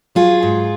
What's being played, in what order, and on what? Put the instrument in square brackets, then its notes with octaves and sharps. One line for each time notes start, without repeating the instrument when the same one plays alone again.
[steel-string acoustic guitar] F#3 F4 G#4
G#2